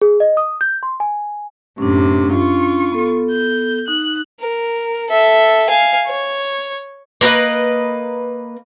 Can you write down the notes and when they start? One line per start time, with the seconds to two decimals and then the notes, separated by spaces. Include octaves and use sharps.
0.02 G#4
0.20 D#5
0.37 D#6
0.61 G6
0.83 C6
1.00 G#5
1.78 F#2 A2 C3 C#4 D4
2.33 F4 C#6
2.92 B3 A4
3.32 G6
3.88 D#4 F#6
4.40 A#4
5.10 A4 E5
5.69 F5 G#5
6.07 C#5
7.21 A#3 A#4 B4 D#5